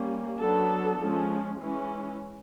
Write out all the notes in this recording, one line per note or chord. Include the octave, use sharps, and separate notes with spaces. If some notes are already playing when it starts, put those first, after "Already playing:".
Already playing: G3 A#3 C#4
F#3 B3 D4 A4
F3 G#3 C#4
E3 G#3 C#4